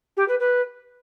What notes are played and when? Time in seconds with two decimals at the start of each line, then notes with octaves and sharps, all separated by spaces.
0.17 G4
0.28 B4
0.40 B4